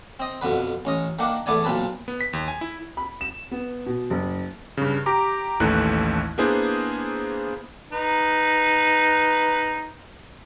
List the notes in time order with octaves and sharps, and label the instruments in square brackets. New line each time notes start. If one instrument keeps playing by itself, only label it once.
[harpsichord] C4 D#5
F2 B2 D3 B4
A1 C#4 D#5
D#3 A#3 D4 F#5
E2 A3 B3 D5 G#5
B1 A#2 C4 B4 A5
[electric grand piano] B3
B6
D#2
G#5
E4
[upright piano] B5
E7
B3
B2
F#1
[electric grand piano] G2 C#3
G4 A#5 D6
A1 D#2 E3 A3 F#6
A#3 B3 D4 E4 G#4 C5
[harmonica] D#4 B4